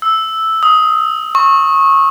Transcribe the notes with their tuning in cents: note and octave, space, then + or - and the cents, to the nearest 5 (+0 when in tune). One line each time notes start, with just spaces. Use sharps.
E6 -5
D#6 +15
C#6 -20